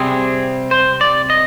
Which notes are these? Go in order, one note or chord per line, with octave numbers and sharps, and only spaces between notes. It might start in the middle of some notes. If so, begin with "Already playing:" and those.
Already playing: C3 G3 C4 G#4
C5
D5
D#5